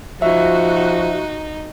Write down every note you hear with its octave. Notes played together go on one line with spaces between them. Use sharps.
F3 D#4 F#4 E5